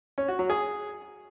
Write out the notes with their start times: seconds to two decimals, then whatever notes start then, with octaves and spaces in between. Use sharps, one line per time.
0.18 C#4
0.28 F#4
0.39 F#3
0.50 G#4